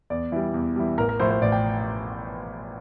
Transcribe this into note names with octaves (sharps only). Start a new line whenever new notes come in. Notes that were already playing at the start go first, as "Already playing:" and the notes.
E2 D5
E3 G3
E2
E3 G3
A1 A#4
A#4
A2 F3 C5
C5
A1 D5
G5